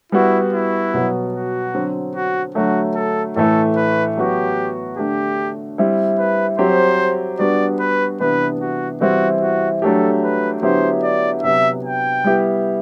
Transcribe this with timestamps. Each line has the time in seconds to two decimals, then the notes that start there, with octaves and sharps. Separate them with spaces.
0.12 G3 B3 E4 F#4
0.53 E4
0.94 B2 F#3 B3
1.34 F#4
1.74 D3 F#3 C4
2.15 F#4
2.55 D3 F#3 A3 F#4
2.95 A4
3.36 A2 E3 A3 A4
3.76 B4
4.16 F#3 B3 F#4 G4
4.97 D3 A3 D4 G4
5.78 G3 C4 E4
6.19 B4
6.58 F#3 C4 G4 C5
7.39 G3 B3 D4 F#4 D5
7.80 B4
8.20 C3 E3 B3 D4 B4
8.61 F#4
9.01 E3 G3 C4 E4 F#4
9.41 F#4
9.82 F#3 A3 D4 G4 A4
10.22 B4
10.62 D3 F#3 B3 E4 G4 C5
11.03 D5
11.43 C3 F#3 B3 E5
11.84 G5
12.24 G3 B3 E4 G4